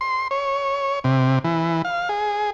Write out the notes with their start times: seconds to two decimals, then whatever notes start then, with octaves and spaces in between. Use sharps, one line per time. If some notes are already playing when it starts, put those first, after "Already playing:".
0.01 C6
0.31 C#5
1.04 C3
1.44 E3
1.85 F5
2.09 G#4